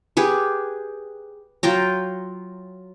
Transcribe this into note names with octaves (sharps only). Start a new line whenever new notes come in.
G4 G#4 B4
F#3 F4 G5 A#5